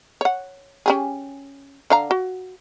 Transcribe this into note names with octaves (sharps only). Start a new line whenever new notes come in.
C#5 F#5
C#4 G4 G#4
D3 F5 A#5
F#4